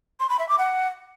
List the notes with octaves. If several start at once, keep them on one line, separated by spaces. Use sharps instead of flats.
C6
B5
E5
D6
F#5